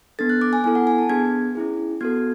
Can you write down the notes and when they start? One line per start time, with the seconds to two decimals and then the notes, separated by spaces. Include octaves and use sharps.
0.19 B3 D4 A4 A6
0.29 F#6
0.41 D6
0.53 G#5
0.64 B3 E4 A4 G#5
0.75 F#5
0.87 G#5
0.98 A5
1.09 B3 D4 G#4 G#6
1.55 C#4 E4 G#4
2.01 B3 F#4 A4 G#6